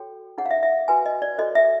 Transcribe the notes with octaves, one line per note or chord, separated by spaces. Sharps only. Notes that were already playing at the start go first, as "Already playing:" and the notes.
Already playing: F#4 A4 C#5 G5
D#4 G#4 C#5 F#5
F5
E5
E5
F#4 B4 G#5
D#5
D5
F#4 A4 C5 D#5
E5